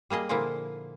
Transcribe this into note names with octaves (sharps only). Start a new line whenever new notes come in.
G3 A#3 G#4 D#5
A#2 D3 F3 A#3 E4